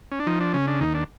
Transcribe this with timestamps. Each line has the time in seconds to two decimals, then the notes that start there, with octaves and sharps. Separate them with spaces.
0.12 C#4
0.20 D4
0.27 F3 D#4
0.40 D4
0.54 C#3 C#4
0.67 D4
0.81 D#2 D#4
0.94 D4